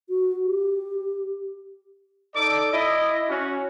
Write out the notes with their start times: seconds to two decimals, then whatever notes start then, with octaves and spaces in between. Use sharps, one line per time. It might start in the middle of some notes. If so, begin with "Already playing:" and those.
0.10 F#4
0.45 G4
2.35 D#4 A4 D5 D6
2.73 E4 D#5
3.29 C#4 F#4